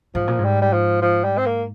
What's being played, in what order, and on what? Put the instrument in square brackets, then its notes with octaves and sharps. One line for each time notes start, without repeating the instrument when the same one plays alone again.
[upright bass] G#2 [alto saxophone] F3
[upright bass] A#2
G#2
[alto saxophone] G3
G3
F3
F3
G3
C4
A#3